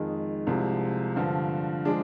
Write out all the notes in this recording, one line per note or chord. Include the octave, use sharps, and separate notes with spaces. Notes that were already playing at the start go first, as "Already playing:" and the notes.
Already playing: F2 D#3 G#3
C2 C3 F3 G#3
G2 D3 F3
F3 G#3 D4 G#4